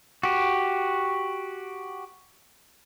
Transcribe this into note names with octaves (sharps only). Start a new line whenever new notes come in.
F#4 G4